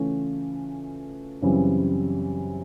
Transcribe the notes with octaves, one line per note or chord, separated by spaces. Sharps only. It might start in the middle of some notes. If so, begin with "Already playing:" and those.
Already playing: C#3 E3 A3 C#4 F4
F#2 C#3 E3 G3 C4